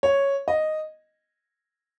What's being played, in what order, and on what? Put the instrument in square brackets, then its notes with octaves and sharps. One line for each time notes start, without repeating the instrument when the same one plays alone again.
[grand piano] C#5
D#5